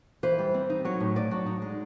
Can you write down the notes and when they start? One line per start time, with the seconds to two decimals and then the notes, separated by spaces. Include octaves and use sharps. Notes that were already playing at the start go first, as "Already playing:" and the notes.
0.23 E3 C5
0.39 G3
0.54 C4
0.70 D#4
0.85 F#3 C#5
1.00 A2
1.16 D#4 D5
1.31 F#3
1.46 D#4
1.62 G#3